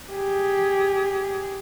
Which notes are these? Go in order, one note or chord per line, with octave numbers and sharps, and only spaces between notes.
G4 G#4